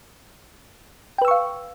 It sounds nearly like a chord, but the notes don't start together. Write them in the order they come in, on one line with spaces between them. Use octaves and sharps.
G5 B4 E6 C#6 F5